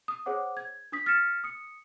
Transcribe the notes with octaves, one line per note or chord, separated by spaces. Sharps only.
D#6
G#4 C5 C#5 F#5 D6
G#6
D4 D#6 B6
F6 A6 B6 C#7 E7
D#6 C#7